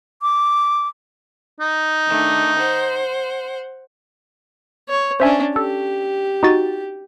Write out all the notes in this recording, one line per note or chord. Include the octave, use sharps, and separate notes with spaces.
D6
D#4
D#3 A3 D4
C5 F#5
C#5
C#4 D4 C5 E5 G#5
G4 A4
D#4 F#4 A6